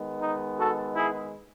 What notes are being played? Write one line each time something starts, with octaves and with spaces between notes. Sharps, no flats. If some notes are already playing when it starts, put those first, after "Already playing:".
Already playing: D#3 G#3 B3
D#4
F#4 A4
E4 G#4